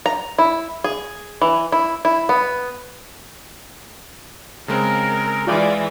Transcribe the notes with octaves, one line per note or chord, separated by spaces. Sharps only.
A#5
E4
G#4
E3
E4
E4
B3
C#3 G#3 C4 A#4
E3 G#3 F4 D5